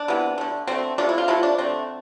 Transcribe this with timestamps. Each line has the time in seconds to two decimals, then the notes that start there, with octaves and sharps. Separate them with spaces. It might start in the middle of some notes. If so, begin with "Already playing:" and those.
Already playing: D4
0.08 C3 E3 B3
0.38 D3 A3
0.67 D3 A3 C4
0.98 C3 F3 A3 D4
1.09 E4
1.18 F4
1.28 C3 F3 A3 E4
1.43 D4
1.58 D3 A3 C4